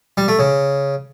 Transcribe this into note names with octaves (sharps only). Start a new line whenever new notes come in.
G3
A3
C#3